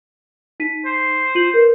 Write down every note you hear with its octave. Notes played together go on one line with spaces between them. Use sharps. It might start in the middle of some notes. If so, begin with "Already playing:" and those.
D#4 B6 D#7
C5
F4 D#7 F#7
A#4 B4